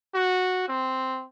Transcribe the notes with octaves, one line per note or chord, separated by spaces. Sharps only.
F#4
C4